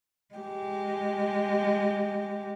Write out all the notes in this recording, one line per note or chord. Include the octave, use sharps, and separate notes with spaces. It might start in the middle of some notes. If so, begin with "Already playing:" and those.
G#3 G4